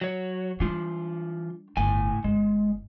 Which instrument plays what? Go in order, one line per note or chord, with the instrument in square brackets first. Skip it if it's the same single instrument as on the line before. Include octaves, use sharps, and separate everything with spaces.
[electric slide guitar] F#3 C#5
[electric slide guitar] E3 F4 [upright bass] G3 D4
[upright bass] G1 [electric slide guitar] A2 G#5
[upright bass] G1 [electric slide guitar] G#3